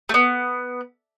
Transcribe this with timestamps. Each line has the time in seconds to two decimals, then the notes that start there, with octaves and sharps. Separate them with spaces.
0.09 A3
0.14 B3